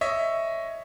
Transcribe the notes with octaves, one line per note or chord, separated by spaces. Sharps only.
C#5 D#5 E5